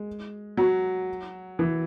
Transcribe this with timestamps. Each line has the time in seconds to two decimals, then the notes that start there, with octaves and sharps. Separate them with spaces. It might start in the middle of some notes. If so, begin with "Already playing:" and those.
Already playing: G#3
0.57 F#3
1.59 E3